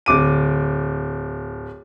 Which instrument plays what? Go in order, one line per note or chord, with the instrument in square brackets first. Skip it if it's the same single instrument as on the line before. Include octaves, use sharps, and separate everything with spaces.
[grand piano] D1 D6 D#7